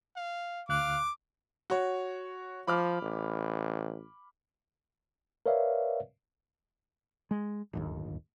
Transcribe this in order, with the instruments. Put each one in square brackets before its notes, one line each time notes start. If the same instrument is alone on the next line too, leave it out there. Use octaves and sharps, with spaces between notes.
[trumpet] F5
[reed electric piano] D2 F#6 [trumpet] F5 [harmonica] D6
[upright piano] F#4 C#5
[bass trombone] F3 [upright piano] B5 D6 F6
[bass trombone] A1
[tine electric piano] A#4 B4 C#5 D5 E5 F5
[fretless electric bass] G#3
D1 G1 D#2